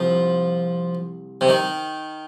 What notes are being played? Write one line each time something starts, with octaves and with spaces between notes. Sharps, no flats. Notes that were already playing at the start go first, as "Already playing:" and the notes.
Already playing: C2 F3
C3
D#3